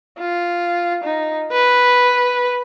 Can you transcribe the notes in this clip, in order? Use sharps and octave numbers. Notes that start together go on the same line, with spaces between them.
F4
D#4
B4